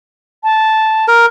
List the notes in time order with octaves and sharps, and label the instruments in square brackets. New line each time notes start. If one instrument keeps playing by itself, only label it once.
[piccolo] A5
[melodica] A#4